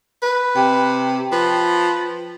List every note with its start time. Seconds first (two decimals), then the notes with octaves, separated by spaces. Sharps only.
0.22 B4
0.56 C3 G5
1.32 F3 B4